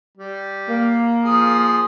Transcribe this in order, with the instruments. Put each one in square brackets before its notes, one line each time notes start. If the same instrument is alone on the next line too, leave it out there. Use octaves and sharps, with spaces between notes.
[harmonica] G3
[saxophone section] A#3
[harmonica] F3 G#4 D#6